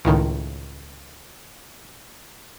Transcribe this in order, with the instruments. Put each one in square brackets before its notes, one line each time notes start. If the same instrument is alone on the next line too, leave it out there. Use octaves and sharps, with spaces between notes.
[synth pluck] C#2 A2 D#3